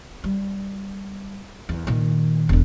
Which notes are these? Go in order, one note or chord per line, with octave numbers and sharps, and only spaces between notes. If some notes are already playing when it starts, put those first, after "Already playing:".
G3
E2
A#2 D#3
E1 D3